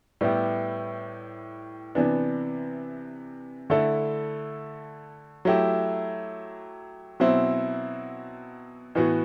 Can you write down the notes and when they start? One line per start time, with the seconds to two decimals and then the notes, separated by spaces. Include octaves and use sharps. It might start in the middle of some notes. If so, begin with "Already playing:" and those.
0.21 A2 G3 B3 E4 G4
1.95 C3 E3 B3 D4
3.70 D3 A3 E4 A4
5.45 F#3 A3 E4 G4
7.20 B2 F#3 C4 E4
8.95 A2 E3 B3 F#4